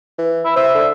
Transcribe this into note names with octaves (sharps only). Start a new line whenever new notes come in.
E3
E4
C5 E5
D3